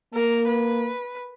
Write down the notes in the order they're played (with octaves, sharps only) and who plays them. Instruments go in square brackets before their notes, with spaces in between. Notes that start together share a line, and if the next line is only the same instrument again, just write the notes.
[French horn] A#3 [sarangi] A#4
[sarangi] B4